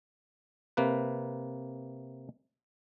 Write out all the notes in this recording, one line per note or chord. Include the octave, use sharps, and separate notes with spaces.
C3 A#3 B4